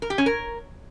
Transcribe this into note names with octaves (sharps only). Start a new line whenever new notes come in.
A#4
G4
C#4
A#4